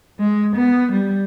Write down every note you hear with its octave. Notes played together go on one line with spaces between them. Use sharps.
G#3
B3
G3